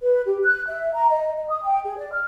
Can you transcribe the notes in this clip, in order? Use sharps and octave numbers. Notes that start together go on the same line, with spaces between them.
B4
G4
F#6
E5
A#5
D#5
D#5
D#6
G5
G#4
D5
F6